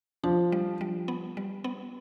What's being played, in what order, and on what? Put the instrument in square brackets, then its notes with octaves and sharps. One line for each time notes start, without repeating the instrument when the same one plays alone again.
[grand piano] F3 [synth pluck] D4
[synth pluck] G3
G3
B3
G3
B3